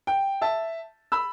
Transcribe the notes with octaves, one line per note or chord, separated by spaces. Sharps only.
G5
E5 A5
B5 E6